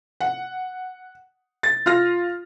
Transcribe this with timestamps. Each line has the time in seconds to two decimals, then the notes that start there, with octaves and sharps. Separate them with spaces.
0.21 F#5
1.63 A6
1.86 F4 F6 A#6